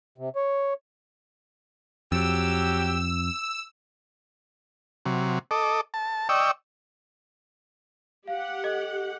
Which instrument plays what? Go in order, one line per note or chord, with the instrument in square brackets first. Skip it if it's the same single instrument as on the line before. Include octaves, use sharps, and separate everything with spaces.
[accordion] C3
C#5
[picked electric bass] F2 [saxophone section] F#3 G4 [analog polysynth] E6
[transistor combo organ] C3 F#3
A4 D#5 D6
A5
D5 D#5 G5 C#6 E6
[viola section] G4 F#5 [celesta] F5
[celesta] A4 D#5